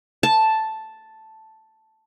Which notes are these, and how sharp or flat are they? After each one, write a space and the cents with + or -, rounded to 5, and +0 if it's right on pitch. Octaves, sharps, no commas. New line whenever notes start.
A5 +0